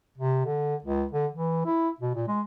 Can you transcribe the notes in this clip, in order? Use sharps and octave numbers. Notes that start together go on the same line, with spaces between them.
C3
D3
C#2
D3
E3
E4
B2
A#2
G#3